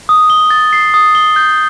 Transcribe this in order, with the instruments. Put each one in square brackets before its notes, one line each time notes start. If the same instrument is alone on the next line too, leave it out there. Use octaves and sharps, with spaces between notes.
[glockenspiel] D#6
G7
A6
C7
D#6
G7
G6